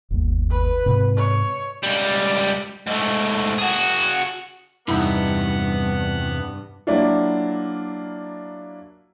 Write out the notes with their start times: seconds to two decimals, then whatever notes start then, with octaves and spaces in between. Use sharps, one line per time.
0.10 G1 D#2
0.50 B4
0.86 G#2 C3 C4
1.17 C#5
1.83 C#2 G3
2.87 G#2 A3
3.58 F#4 G#4
4.88 E2 G2 C3 B3 D#4 E4 F#5
6.87 F#3 A#3 D4 E4 F4